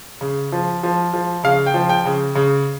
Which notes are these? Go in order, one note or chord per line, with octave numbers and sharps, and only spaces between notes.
C#3
F3
F3
F3
C#3 F5
G5
F3
G5
C#3
C#3